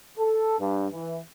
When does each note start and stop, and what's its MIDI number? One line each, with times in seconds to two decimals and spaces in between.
0.18 0.56 69
0.59 0.87 43
0.92 1.19 52